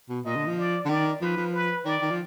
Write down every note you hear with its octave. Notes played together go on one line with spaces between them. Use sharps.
B2
A#2 D#5
D3
F3
D5
D3
D#3 D5
F3 B4
F3
B4
D#3 D5
D#3
F3